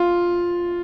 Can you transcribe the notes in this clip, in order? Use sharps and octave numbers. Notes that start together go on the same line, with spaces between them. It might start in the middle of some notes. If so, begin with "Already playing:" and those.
Already playing: F4